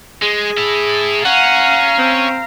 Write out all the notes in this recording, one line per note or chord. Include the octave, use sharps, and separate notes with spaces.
G#3 G#4
E4 A4
C#4 F5 F#5 A#5
C4